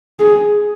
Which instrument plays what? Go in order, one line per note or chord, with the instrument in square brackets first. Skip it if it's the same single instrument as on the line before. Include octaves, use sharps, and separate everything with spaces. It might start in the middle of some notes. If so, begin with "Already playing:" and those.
[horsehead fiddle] G#4